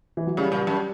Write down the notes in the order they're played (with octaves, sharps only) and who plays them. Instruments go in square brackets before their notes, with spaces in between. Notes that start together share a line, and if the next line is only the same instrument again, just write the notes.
[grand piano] E3
F#3
[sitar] C#3 [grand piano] G3
[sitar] A#2
F#2